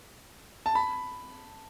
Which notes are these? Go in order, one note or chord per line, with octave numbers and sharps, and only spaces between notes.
A5
B5